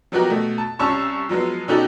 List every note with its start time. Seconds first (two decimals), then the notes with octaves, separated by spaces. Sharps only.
0.12 F3 F#3 B3 F#4 G4 A#4
0.30 B2 A3
0.58 A5
0.79 C2 C#4 A5 C#6 E6
1.29 F3 F#3 G#3 B3
1.68 B2 C#4 D#4 F#4 G4 A4